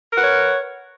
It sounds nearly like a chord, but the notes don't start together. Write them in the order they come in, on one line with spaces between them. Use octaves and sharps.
A#4 F#5 B4 C#5